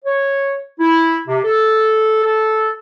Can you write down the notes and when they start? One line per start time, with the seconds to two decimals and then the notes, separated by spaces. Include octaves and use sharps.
0.05 C#5
0.80 E4
1.28 C3
1.44 A4
2.24 A4